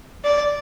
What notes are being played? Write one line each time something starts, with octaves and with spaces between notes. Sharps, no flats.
D5